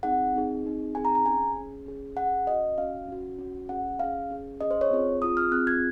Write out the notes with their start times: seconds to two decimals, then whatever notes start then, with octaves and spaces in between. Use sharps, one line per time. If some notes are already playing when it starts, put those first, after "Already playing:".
0.03 C4 D#4 G#4 F#5
0.34 C4 D#4 G#4
0.64 C4 D#4 G#4
0.95 C4 D#4 G#4 G#5
1.05 A#5
1.15 A#5
1.25 C#4 G#4 G#5
1.56 C#4 G#4
1.86 C#4 G#4
2.16 C#4 G#4 F#5
2.47 C#4 F#4 D#5
2.78 C#4 F#4 F5
3.08 C#4 F#4
3.39 C#4 F#4
3.69 C#4 G#4 F#5
3.99 C#4 G#4 F5
4.31 C#4 G#4
4.61 C#4 G#4 D#5
4.71 C5
4.81 C#5
4.91 C4 F4 G#4
5.22 C4 F4 G#4 D#6
5.37 F6
5.52 C4 F4 G#4 F#6
5.67 G#6